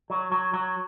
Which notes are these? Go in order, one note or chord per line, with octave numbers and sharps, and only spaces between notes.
F#3
F#3
F#3